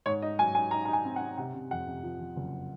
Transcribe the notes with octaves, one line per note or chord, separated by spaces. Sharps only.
G#2 C#5
D#4 D#5
F#3 G#5
D#4 G#5
D#4 A#5
D#4 A#5
G#5
C4
F#5
C4
C3 F#5
C3
F2 F#5
C3
F3
F3
F#1